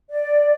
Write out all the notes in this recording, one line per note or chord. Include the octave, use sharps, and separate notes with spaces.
D5